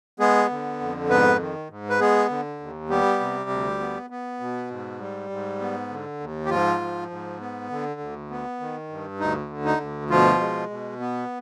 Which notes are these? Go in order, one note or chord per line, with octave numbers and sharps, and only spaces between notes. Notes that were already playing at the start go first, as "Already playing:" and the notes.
G#3 B3 G#4
D3
F2
G#2 B3 B4
D#3
G#2
B4
G#3 B3 G#4
D3
D#2
G3 B3 G4
C3
D2
B3
B3
B2
G#2
G3
G#2
B3
D3
D#2
G4
G#2 F3 F4
F3
G#2
B3
D3
D2
B3
D#3
G2
D2 D#4
D3
D#4
D2
B2 F3 F4
G#3
B2
B3